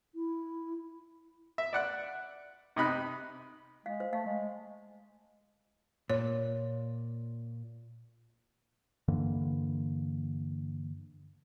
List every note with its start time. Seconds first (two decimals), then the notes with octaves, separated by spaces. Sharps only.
0.15 E4
1.58 E5
1.73 D5 F#5 F#6
2.76 C3 D#4 B5 F#6
3.86 G#3 F5
4.00 C5
4.13 A3 F5
4.26 G#3
6.10 A#2 C#5
9.08 G2 D3 E3 A#3